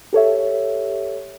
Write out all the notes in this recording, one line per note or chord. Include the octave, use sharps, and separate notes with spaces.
G4 A4 C#5 E5